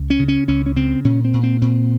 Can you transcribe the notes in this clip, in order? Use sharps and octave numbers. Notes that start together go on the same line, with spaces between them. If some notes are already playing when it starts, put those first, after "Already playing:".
Already playing: C#2
C#4
C#3
C#4
C#2 C#4
C#4
C#3 C4
A#2 C#4
C4
A#2
C4
A#2 C4